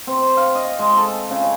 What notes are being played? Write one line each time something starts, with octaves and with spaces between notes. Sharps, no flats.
C4
F5
D#5
G#3
A4
C#3